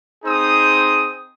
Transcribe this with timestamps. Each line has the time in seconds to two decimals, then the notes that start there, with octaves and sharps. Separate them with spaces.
0.25 C4 D#4 G#4 C5 D#6